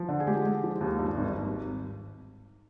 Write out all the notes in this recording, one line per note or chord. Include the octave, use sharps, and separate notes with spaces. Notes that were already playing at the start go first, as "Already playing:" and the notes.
Already playing: F3
D3
G#4
G#3 G4
G#3
F3
D#2
G2
G#1